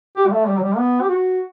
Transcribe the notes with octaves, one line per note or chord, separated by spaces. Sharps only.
G4
G3
A3
G3
F#3
G3
B3
G4
F#4